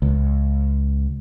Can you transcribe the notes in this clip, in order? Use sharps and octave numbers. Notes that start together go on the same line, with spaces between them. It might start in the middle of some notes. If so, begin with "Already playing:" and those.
C#2